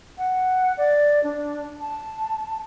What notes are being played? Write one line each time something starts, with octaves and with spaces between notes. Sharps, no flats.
F#5
D5
D4
A5